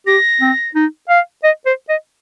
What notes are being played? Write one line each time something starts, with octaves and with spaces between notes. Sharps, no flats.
G4 A#6
C4
D#4
F5
D#5
C5
D#5